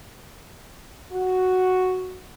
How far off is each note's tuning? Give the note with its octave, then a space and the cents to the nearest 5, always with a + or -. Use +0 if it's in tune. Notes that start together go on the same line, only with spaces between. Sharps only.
F#4 +0